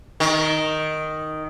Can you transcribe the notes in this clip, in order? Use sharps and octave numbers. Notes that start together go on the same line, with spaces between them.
D#3